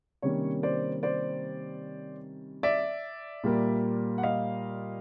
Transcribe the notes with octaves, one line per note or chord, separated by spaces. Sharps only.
C3 D#3 G3 A#3 C#4 C#5
C5 D5
C5 D5
D5 E5
A#2 G3 A#3
F#5
D#5 F5